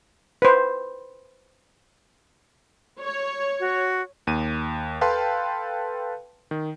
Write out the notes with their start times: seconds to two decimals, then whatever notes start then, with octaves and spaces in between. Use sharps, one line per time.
0.42 B4 C5
3.00 C#5
3.60 F#4
4.27 D#2 D#7
5.01 A4 B4 F5 G5 A5 C6
6.51 D#3